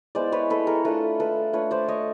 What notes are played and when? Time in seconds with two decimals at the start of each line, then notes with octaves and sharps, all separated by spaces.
0.15 G#3 B3 E4 C5 D5
0.32 B4 C#5
0.50 A4 B4
0.67 G#4 A#4
0.85 A3 D4 F4 A4 B4
1.20 A4 B4
1.53 A3 D4 F4 B4 C#5
1.71 C5 D5
1.88 C#5 D#5